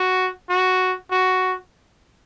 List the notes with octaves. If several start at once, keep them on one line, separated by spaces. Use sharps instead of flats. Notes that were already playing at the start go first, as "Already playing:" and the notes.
Already playing: F#4
F#4
F#4